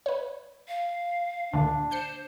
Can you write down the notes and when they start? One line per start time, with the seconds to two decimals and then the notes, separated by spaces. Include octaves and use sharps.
0.06 B4 C#5
0.68 F5
1.53 D2 A#2 D3 D4
1.91 C5 G6 C7 C#7